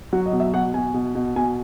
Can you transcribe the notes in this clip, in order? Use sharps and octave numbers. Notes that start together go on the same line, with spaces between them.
F#3 F#4
D#5
B2
E5
B2 F#5
B2 G#5
B2
B2
B2 G#5